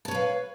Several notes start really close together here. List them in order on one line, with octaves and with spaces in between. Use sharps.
A5 C#5 B4 F5